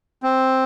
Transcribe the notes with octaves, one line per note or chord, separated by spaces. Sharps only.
C4